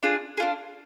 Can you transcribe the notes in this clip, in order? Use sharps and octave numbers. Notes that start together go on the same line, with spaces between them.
D4 F4 G#4
D4 F4 G#4